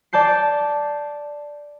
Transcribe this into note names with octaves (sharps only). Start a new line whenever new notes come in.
D5 A5 G6 C7